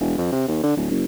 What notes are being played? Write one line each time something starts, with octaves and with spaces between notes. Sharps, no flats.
E1
F2
C3
D#2
D3
D1
F#1